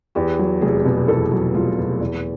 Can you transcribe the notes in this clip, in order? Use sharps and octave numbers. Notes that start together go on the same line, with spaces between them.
E2 G4
F#3
F1 G#4
B2
E2 A4
F#3
F1 F4
B2
E2